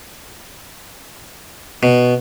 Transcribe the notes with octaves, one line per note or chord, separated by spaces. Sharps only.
B2